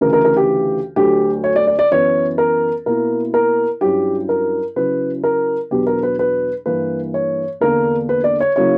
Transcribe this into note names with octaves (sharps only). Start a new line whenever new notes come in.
D2 C#3 E3 A#4
A#4
A#4
G4
D2 D3 F#3 G4
C#5
D5
D5
D5
F#2 E3 B3 C#5
A#4
B2 A#3 E4 A#4
A#4
G2 F#3 C#4 E4 G4
A#4
C#3 F#3 C#4 E4 B4
A#4
E2 B2 F#3 B3 D4 G4
A#4
B4
B4
G2 E3 A#3 B4
C#5
E2 D3 A#3 D4 A#4
B4
D5
C#5
C#3 F#3 A#3 E4 C#5